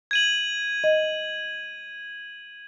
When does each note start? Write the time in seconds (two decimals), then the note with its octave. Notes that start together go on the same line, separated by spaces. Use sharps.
0.11 G#6 D#7 F#7
0.84 D#5